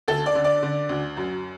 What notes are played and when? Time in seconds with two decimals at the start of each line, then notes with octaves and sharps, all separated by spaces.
0.08 D2 A4
0.26 D5
0.35 D3
0.44 D5
0.62 D3
0.89 D2
1.17 F#2